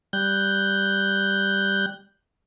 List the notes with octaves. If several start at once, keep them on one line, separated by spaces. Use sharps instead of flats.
G3 F#6 G6